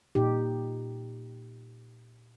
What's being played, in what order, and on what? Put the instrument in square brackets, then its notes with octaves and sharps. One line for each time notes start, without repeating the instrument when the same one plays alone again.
[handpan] A#2 D#4 G4